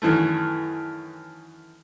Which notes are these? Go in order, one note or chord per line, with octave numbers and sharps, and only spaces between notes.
F#2 D#3 E3 A3